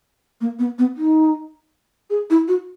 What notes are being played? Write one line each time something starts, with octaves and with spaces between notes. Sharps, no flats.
A#3
B3
B3
D#4
G#4
E4
F#4